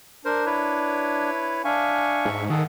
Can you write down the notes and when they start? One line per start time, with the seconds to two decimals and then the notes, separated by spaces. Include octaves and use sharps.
0.25 D4 A#4 C5
0.46 E4 B4 C#5
1.65 D4 E5 F5 G#5 C#6
2.25 G#2
2.50 D#3 G#4 A4 F#5